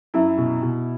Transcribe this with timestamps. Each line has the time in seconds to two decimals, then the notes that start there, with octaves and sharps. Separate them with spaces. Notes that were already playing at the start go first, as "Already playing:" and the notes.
0.14 F#2 E4
0.38 B2
0.62 B2